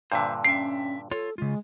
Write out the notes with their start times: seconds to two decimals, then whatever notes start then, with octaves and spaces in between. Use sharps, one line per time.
0.12 G2 A#2 D3 C5 E5
0.45 C#4 E5 G5 C7
1.11 F4 A4 C#5
1.38 C#3 G#3 F4